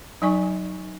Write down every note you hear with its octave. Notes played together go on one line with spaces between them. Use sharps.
F#3 D#4 D5 G#5 C#6